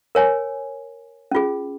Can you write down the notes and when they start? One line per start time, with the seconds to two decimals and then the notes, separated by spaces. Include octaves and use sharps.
0.15 A#4 C#5 G#5
1.31 C#4 F4 G#4